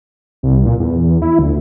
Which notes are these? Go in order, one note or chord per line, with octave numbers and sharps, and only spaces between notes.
C2
A#2
E2
E4
D2